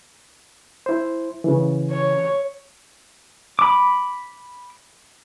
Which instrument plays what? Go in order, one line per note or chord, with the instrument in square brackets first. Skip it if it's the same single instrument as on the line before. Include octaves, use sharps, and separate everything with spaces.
[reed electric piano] E4 C5
C#3 E3
[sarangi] C#5
[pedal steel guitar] B5 D6